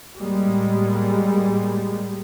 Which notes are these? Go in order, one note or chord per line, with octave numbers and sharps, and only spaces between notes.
A2 G3 G#3 A#3